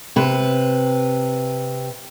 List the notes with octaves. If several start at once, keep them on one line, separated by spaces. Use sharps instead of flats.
C3 B4